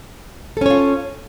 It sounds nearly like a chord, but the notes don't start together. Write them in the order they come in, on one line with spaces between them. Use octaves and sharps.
A4 C#4 C#5 F4